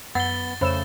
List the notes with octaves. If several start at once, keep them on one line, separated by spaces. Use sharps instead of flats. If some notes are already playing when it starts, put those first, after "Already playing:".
F#2 B3 F#5 E6 A6 G7
F2 C#3 A3 C5 C#5 B5 E6 E7